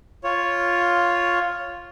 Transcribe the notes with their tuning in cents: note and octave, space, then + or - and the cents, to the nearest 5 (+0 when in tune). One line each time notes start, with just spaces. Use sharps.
F4 +0 C#5 +0